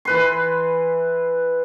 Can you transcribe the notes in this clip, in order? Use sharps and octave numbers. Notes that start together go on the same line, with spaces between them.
E3 B4 C6